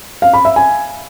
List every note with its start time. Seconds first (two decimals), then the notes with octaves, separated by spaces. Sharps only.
0.22 F5
0.33 B5
0.45 E5
0.56 G#5